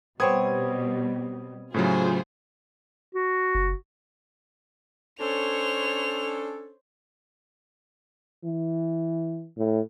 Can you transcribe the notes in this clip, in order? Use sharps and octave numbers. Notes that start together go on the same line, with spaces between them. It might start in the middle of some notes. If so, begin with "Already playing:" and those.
B2 G3 B3 C4 C#5 D#6 G#6
A2 C#3 F#3 F4 G#4 C5
F#4
F#1
C#4 D4 A4 C5 C#5 F7
E3
A2